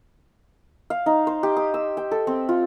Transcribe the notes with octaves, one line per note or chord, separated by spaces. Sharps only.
F5
D#4
C5
G4
D#6
E6
G5
A4
C4
F4